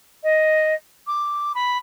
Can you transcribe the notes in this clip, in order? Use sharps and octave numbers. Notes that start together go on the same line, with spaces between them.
D#5
D6
B5